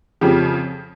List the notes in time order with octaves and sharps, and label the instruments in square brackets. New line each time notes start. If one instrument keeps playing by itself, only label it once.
[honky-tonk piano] F2 C#3 F3 [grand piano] G4